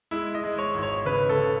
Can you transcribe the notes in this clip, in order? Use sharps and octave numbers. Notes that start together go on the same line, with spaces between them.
G#3 E4
D#5
G#3
C#5
G#1
C#5
C#3 B4
A4
C#3